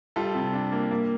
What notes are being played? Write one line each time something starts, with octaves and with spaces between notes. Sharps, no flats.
G3 F4 A4
C3
D4
A#3
A#3